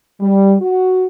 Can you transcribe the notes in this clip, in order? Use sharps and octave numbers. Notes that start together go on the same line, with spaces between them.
G3
F#4